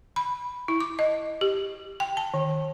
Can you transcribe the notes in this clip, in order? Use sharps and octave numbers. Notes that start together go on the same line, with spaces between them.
B5
E4
D6
D#5
G4
G5
A5
D#3